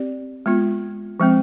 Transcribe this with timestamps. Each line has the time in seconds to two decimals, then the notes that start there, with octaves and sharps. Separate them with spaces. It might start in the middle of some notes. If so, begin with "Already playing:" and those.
Already playing: C4 G4 D5
0.46 G#3 B3 F4
1.20 F3 G#3 C4